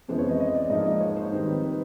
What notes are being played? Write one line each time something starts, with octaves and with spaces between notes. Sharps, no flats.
F2 C#3 E3 G#3 B3 C5
C#5
D#5
D#5
D5
G#2 F3 A#3 D#4 D#5
D#5
C#5
C5
D#3 G3 C4 D#4 B4
B4